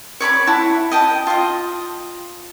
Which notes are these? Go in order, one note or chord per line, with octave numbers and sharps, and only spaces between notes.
C#5 D5 B5 D6
E4 F#5 A5
D#5 G5 A5
F4 D#5